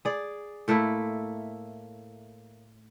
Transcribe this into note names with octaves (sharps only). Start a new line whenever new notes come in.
G#4 D5
A2 A3 A#3 E4